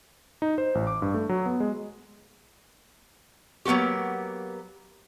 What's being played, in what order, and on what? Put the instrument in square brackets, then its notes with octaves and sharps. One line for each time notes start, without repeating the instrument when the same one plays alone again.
[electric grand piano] D#4
C5
A1
D6
G2
A3
F#3
B3
G#3
[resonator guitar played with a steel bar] F#3 A#3 B3 F#4 G4